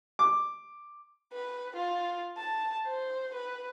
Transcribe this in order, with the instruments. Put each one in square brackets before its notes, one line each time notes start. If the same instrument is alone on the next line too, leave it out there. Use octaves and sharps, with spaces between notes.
[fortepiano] D6
[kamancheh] B4
F4
A5
C5
B4